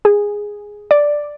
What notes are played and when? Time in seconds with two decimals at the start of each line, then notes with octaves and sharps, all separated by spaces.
0.05 G#4
0.91 D5